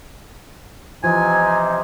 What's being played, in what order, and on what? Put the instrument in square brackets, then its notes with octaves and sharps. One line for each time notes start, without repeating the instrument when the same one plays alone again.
[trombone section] C3 D#4 [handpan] E3 F3 [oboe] G#5